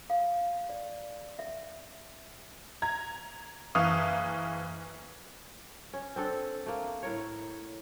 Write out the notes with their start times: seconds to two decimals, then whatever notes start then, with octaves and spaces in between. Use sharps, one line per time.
0.10 F5
0.69 D5
1.39 E5
2.82 A#5 G#6
3.75 F#1 E3 F5 C#6 D#6
5.93 C#4
6.16 C4 D4 A4
6.66 A3 A#3
7.03 A2 A#4 C#5